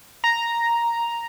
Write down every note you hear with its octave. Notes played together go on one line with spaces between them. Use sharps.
A#5